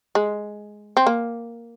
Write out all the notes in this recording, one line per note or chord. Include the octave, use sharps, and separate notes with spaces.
G#3
C4
A#3